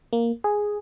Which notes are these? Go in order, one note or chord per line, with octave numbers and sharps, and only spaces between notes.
A#3
G#4